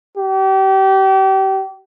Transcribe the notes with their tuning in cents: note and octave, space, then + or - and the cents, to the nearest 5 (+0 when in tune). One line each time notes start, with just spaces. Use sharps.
G4 -35